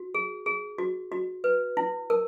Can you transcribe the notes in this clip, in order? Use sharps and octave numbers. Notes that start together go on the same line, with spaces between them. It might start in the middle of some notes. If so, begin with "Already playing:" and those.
Already playing: F#4
G#4
G#4
F#4
F#4
B4
E4
A#4